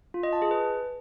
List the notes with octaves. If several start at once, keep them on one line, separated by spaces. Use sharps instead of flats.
F4
D#5
A5
G#4
B4